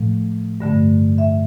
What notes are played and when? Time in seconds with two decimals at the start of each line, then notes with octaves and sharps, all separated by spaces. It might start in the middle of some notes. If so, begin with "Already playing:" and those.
Already playing: A2 F3 A3
0.60 G2 D3 A3
1.18 E5